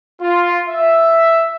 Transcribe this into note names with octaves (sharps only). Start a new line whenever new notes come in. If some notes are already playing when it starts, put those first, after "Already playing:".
F4
E5